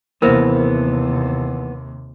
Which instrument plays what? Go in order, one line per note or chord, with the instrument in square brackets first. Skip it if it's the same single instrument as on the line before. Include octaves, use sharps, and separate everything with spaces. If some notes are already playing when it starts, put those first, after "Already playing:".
[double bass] D#2 C3 [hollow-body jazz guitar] E3 A#3 B3 [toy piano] A#4 C5 E5